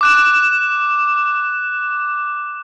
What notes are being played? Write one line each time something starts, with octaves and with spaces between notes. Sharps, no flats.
D6 F#6 E7